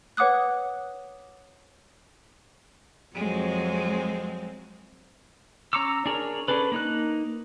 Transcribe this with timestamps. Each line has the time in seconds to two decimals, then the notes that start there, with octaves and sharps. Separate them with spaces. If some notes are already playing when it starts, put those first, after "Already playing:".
0.17 B4 C#5 F#5 D6 D#6 F#6
3.16 F2 F#3 G#3 C4
5.73 C#4 A#5 C#6 D6 E6
6.06 D4 G#4 A#4 C#5
6.48 C#4 D4 G#4 A4 B4
6.72 A#3 D#4 F#6